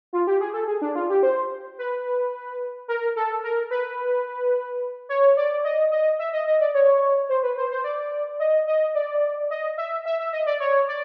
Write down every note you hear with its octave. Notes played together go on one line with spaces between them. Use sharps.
F4
G4
G#4
A4
G#4
D4
F4
G4
C5
B4
A#4
A4
A#4
B4
C#5
D5
D#5
D#5
E5
D#5
D#5
D5
C#5
C5
B4
C5
C5
D5
D#5
D#5
D5
D#5
E5
E5
E5
D#5
D5
C#5
D5